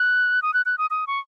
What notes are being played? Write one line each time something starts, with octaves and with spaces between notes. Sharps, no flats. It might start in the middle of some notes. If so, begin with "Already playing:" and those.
Already playing: F#6
D#6
F#6
F#6
D#6
D#6
C#6